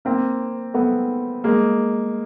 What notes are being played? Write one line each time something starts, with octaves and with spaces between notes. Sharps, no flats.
A#3 C4
A3 B3
G#3 A#3